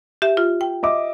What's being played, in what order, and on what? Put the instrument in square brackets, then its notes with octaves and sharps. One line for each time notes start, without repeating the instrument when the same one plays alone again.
[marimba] G4 E5
F4
G5
[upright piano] D#5 E5 D6